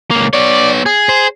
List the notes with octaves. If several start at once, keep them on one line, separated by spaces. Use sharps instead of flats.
C#2 A#3
B3 C#5 D5
G#4
C5